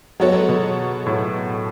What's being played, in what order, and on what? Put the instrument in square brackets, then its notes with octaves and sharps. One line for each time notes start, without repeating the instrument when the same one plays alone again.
[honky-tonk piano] F#3 B3 F#4 A4 C#5 [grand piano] G#3
[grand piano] B2
A2